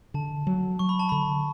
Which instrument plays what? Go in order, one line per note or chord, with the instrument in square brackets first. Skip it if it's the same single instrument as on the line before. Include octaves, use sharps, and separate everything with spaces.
[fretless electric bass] D3 [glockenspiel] A5
[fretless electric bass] F#3
[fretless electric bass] F#3 [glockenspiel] C#6
[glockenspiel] B5
A5
[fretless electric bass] D3 [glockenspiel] B5